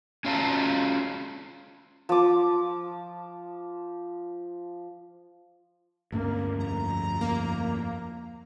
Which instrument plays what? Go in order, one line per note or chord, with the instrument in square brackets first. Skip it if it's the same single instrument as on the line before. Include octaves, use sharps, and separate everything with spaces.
[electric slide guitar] C#4 F4 F#4 F5 A5 A#5
[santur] F3 D6
[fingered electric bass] D2 G2 C#4 [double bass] A#3
[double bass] F2 [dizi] A#5
[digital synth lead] A#3